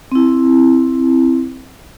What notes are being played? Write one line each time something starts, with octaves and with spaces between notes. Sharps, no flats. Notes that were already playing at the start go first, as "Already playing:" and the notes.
C4 E4